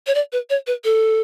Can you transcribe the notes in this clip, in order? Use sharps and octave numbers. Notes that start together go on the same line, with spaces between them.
C#5
D5
B4
C#5
B4
A4